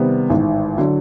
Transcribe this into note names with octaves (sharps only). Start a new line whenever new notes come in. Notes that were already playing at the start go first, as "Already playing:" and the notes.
Already playing: C3 D#3 G3 B3
A1 G#2 D#3
D3 F#3